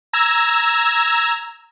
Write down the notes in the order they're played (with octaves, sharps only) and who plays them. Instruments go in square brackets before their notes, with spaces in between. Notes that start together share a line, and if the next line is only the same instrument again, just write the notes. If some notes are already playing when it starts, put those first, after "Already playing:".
[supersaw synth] A#5 E6 G#6